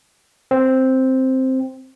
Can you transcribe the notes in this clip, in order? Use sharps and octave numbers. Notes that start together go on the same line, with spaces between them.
C4